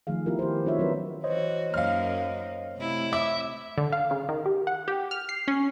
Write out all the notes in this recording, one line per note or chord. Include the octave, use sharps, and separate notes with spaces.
D#3 F3 A3 G#4 F5
B3 E4 F4 G4 A#4
G4 C5
C4 D#4 F4 F#4 C#5 E5
F#3 C4 D4 F#4 A#4 B4
E3 F#4 C5 C#5 D#5
F#2 A#3 D#4 F5 F6
C3 A3 E4
E5 D6
D3
F5
C#3
D#3
G4
F#5
G4
F6
C7
C#4